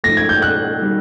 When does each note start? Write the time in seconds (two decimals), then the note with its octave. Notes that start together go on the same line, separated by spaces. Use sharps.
0.04 G#2 F3 A3 A#6
0.17 G#6
0.29 G6
0.42 F#6
0.82 D#3 G3